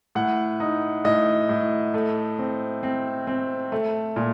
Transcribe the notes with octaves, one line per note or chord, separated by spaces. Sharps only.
A2 F#5
D#4
A2 D#5
A2
A3
C4
C4
C4
A3
A#2